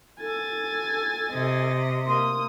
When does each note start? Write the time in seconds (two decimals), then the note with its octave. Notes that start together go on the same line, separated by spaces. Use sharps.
0.21 A4 G#5 A6
1.31 C3 D#5
2.06 A#3 C6 D#6